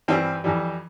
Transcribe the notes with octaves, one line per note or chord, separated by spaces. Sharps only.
G2 E3 G3 C4
F2 E3 G3